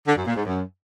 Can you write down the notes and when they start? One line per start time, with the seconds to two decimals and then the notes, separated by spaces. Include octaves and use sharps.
0.06 D3
0.16 F#2
0.26 A#2
0.35 G#2
0.45 F#2